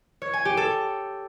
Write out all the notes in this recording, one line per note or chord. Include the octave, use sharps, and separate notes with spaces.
C#5
G#5
G4
A4